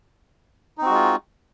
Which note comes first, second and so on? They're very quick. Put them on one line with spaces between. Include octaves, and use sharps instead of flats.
D#4 C4 F#4 G#3 F4